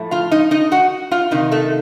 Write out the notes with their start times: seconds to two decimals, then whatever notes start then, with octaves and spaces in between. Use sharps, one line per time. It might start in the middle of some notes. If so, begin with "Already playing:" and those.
Already playing: A2 F3 A3
0.11 F4 F5
0.31 D#4 D#5
0.51 D#4 D#5
0.72 F#4 F#5
1.11 F4 F5
1.31 C3 D#3 A#3 D#4
1.51 A3 A4